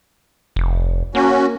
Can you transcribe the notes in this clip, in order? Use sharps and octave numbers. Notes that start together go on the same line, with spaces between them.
F1
A#3 C#4 F#4